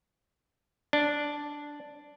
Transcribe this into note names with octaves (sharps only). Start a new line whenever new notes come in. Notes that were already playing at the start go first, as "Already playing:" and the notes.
D4